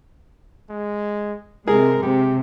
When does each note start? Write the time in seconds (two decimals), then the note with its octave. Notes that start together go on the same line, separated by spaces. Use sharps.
0.70 G#3
1.68 C3 G#3 G#4 A#4
2.03 C3 G4